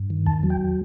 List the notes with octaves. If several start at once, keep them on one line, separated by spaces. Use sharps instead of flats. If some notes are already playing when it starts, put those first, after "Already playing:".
Already playing: G2
D#3
E2 A5
F#3
G5